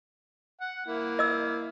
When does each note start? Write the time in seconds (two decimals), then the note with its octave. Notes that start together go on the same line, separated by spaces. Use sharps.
0.61 F#5
0.86 A#3 E4
1.19 D#5 E6